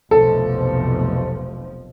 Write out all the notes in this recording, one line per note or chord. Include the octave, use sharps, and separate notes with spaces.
F1 B1 F3 A4